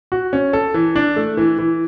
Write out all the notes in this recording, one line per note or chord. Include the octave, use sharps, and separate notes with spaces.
F#4
C#4
A4
E3
D4
A3
E3
E3